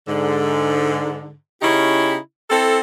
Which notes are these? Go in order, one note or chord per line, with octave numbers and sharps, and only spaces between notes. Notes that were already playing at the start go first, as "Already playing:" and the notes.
G#2 D3
C#3 C#4 D#4 E4 G4
C4 E4 A4